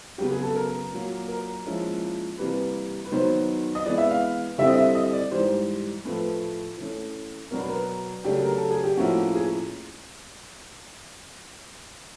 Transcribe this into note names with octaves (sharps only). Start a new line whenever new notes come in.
C#3 F#3 B3 G4
G#4
A4
A#4
A#2 F#3 A#3
A#4
A#2 F3 G#3 C#4 E4
C3 E3 G3 A#3 B4
B4
D#3 F#3 B3 C5
D#5
E3 G#3 B3 D5
E5
F5
D3 G3 C4 E4 E5
D#5
E5
D#5
D5
G#2 E3 G3 C5
A2 F3 A3 B4
E3 A3 C#4
B2 F#3 B3 D4 A#4
B4
A#4
C#3 F#3 A3 D4 G4
A#4
A4
G#4
G4
A2 F3 A#3 C#4 E4 F#4
G#4